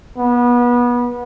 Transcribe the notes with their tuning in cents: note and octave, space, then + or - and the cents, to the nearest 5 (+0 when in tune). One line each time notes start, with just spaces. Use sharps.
B3 -25